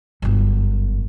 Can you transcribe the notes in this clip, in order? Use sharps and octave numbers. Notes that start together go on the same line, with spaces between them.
G1 F#2